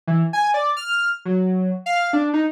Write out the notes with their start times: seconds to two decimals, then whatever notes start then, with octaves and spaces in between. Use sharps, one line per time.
0.07 E3
0.33 G#5
0.54 D5
0.77 F6
1.25 F#3
1.86 F5
2.13 D4
2.34 D#4